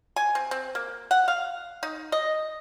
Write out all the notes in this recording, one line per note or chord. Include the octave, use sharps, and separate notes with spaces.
G#5
C4
C4
A#3
F#5
F5
D#4
D#5